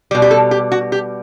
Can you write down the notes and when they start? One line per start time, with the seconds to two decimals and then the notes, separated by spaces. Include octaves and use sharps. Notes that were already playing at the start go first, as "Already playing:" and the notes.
0.11 B2 G3 G4
0.22 G4
0.31 A4
0.51 G4
0.72 F#4
0.92 G4